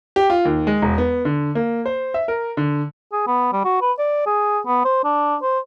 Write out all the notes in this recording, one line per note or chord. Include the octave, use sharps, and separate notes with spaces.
G4
F4
D#2
G#3
E1
B3
D3
A#3
C5
E5
A#4
D3
G#4
B3
G3
F#4
B4
D5
G#4
B3
C5
D4
C5